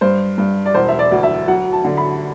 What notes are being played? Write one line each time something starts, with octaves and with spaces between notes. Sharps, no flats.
G2 C5
G2
D5
E1 C5
E5
D5
D2
E5
F#3 F#5
A5
D3
B5